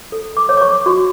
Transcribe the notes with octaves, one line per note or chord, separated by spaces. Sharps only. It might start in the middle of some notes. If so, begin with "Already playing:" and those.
A4
D6
C#5
D6
C#6
F#4 C#6